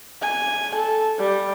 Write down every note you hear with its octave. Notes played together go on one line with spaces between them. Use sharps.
G#5
A4
G3